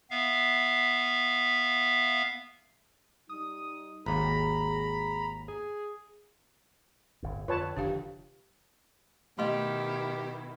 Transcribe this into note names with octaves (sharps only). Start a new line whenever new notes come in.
B3 E5 F5
G3 D#4 D#6
G#1 D#2 G#4 A#5 B5
G#4
G1 A2
F2 D3 F4 B4 C#5 A5
F1 D3 D#3 D4 G4 F5
B2 D#3 A3 E4 G4 D#5 C6